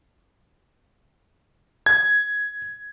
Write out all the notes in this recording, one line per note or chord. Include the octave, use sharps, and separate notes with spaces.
G#6